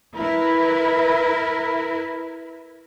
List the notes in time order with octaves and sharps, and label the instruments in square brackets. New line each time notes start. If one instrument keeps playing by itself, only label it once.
[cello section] E4 A#4 B4